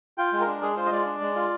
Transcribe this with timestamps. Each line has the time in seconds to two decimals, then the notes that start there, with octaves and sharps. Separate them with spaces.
0.18 F4 G5
0.33 G#3
0.40 A#4
0.47 D4
0.62 G#3 G#4
0.77 F4 C5
0.86 D#5
0.91 G#3 D5
1.06 D4
1.21 G#3
1.35 F4